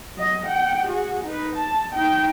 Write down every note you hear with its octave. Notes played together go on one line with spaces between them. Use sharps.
F#3 D#5
F#5 G5
F#4 G#4
D#4 B4
A5
D#4 G5